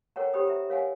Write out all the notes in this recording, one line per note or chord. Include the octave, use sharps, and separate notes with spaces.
A4 A#4 C#5 F#5 G5 A#5
G4 C5 C#5 G5 B5 D#6
E5 A#5
A#4 C#5 F5 F#5 G#5